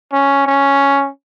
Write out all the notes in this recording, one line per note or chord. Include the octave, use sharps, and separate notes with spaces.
C#4
C#4